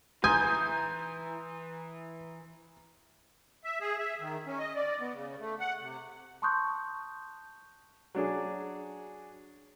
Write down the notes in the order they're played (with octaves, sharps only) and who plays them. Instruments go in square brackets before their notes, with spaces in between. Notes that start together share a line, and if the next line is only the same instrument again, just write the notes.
[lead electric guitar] E3 B4 [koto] G#5 [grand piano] A#5 C6 D#6 [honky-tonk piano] G6
[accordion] E5
G#4
E5
D#3
C#4
D#5
D5
B3
C#3
A3
F#5
C3
[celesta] A5 C6 C#6 D#6 F#6 G6
[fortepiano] F#3 D4 G#4